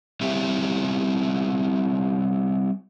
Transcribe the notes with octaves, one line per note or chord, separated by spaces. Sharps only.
G3 C4 C#4 E4 G4 E5